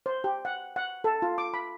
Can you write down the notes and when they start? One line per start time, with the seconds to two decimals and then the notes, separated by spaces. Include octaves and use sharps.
0.06 C5
0.24 G4
0.45 F#5
0.76 F#5
1.04 A4
1.22 F4
1.38 D6
1.54 B5